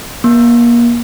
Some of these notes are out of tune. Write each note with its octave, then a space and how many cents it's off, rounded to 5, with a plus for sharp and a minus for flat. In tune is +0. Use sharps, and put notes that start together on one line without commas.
A#3 +30